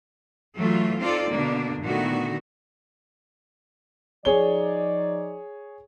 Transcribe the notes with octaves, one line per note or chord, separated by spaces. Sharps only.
E3 F#3 A3 F4
C4 D#4 F4 A4 D5
B2 D3 A#3 D4
A#2 D3 D#3 A3 B3 F#4
F3 D#4 G#4 C#5 D5 G7